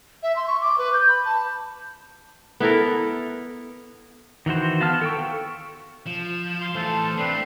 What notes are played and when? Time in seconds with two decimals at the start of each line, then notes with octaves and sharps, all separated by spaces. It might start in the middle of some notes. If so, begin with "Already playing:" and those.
0.23 E5
0.36 C6
0.48 C#6
0.61 D6
0.78 B4
0.93 G6
1.08 B5
1.25 A5
2.60 B3 E4 A4 A#4
4.46 D#3 E3 F#4 C5
4.81 B3 F5 A5 F6
5.02 A4 G5 C#6
6.07 F3 E7
6.61 F5 C6
6.75 E3 A3 A4 C5 F5 A5
7.17 A3 C4 D4 B4 C7